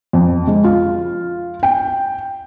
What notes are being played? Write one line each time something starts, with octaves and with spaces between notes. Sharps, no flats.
F2
G#3
F4
G5